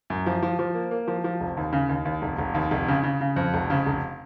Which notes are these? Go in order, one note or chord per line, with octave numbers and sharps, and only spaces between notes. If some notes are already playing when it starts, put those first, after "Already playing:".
F#2
F3
F3
F3
A#3
A#3
F3
F3
F1
D#2
C#3
D#2
D#2
F1
F1
D#2
F1
C#3
C#3
C#3
F2
F1
C#3
F1